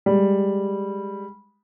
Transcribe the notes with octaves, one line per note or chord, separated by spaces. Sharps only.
G3 G#3